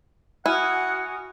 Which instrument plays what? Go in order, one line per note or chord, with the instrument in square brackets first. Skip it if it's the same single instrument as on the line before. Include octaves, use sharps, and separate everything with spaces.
[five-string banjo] E4 [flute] F#4 [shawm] F#5 [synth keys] G#5 D#6 F6